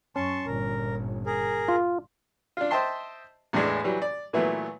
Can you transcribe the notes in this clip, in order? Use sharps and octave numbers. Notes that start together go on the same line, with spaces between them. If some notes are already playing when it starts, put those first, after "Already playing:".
F#2 C#4 A5 C6 C#6
G1 A#2 A#4
G#4 A#4
F4
D4 F4
C5 D#5 E5 G5 A5 C6
E2 A2 E3 G#3 D4
E3 F#3 G3
D5
A#2 E3 F#3 A3 B3